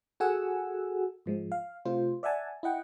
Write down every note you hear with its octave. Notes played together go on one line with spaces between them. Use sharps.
F#4 G#4 A4 F#5 G#5 E6
G#2 F3 G#3
F5
C3 A3 F4 C5
D5 E5 F#5 G#5 A5
E4 D#5 F#5 G5